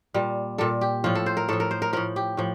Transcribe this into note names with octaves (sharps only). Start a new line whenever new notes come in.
A#2 G3
A#2 G3 A4
G4
A2 F3 F4
A4
C5
A#4
A2 F3 A4
A#4
C5
A#4
A2 F3 A#4
G4
A2 F3